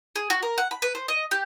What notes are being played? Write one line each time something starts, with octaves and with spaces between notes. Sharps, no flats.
G#4
F#4
A#4
F#5
B5
B4
C5
D#5
G4